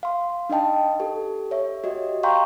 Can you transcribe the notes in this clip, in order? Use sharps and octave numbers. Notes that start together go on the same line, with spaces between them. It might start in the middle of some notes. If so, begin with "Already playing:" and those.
F5 C6
D4 D#4 D#5 G5 A5
G4 A4
C#5 E5
F#4 G4 D#5
F5 G5 A#5 C6 C#6 G6